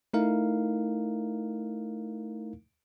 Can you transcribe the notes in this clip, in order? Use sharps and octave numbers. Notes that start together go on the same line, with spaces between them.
A3 D#4 E4 A#4 F5